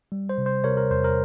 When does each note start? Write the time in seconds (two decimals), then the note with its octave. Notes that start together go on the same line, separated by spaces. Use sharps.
0.12 G3
0.29 C5
0.38 C3
0.46 C5
0.64 C3 A#4 C#5
0.77 A#4
0.91 E2 C5
1.04 A#4